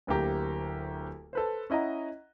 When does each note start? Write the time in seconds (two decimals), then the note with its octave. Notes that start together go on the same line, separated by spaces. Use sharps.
0.07 D1 D2 A#3 G4 A#5
1.33 A4 B4 C5
1.70 C#4 E4 D#5 F#5 A#5